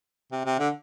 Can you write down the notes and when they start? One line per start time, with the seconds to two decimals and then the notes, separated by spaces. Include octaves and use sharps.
0.32 C3
0.45 C3
0.59 D3